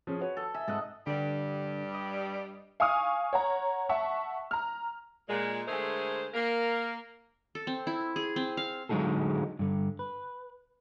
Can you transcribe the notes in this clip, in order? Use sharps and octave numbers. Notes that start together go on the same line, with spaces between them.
F3 C#4 G#4
F#4 B4 C#5
A4
E5 G#5
G#2 A4 D#5 F#5
G2 D3 G3
D#5
F5 G#5 C#6 D#6 F6
C#5 F#5 A#5
E5 F#5 A5 C#6
A#5 F6
A#2 G#3
D3 G#3 A3 G#4 A#4 C5
A#3 A#4
A4
C4
E4
G#4
C4
F5
D3 F#3 G#3 D#4 G#4 A4
G2 D3
B4